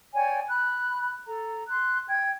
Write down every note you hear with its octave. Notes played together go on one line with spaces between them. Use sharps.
C#5 D5 G5 G#5
B5 F#6
A4 A#5
C6 F#6
G5 G#6